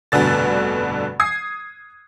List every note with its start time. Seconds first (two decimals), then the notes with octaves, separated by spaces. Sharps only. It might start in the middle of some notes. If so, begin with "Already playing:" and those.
0.12 F1 G2 B2 D3 A6
1.20 D#6 G#6 C7